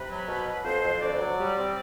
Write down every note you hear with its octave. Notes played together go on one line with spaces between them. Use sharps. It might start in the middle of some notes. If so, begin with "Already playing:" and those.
Already playing: C3 B4
F#3
B2
B2
F2 C5
F2
D2 D5
F#3
G3
C4